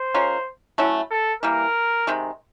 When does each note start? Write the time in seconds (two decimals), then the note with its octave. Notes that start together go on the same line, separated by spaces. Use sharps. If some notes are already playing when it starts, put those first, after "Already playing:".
Already playing: C5
0.14 G#3 C#4 F4 A#4
0.78 F#3 A3 C#4 E4
1.11 A4
1.43 E3 G3 A#3 A#4
2.07 C3 D#3 G#3